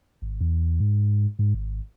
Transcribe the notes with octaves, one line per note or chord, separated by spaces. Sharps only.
G#1
E2
G#2
G#2
G#1